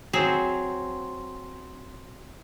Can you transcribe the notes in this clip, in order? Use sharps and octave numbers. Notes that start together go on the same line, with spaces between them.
F#3 C4 G#4 C5